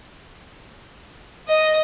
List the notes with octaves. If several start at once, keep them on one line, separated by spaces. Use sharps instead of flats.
D#5